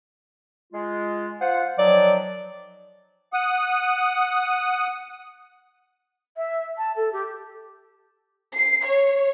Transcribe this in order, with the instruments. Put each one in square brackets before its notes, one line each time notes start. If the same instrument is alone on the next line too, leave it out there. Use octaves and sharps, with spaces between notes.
[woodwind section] G#3 F4
F4 C5 F#5
[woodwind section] D#3 F3 F#3 [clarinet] D5
[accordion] F#5 D#6
[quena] E5
A5
A4
G4
[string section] C7
C#5